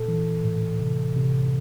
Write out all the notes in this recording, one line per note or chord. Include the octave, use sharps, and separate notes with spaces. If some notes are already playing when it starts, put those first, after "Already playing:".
Already playing: A#2 A4
E3
A2
C3
C3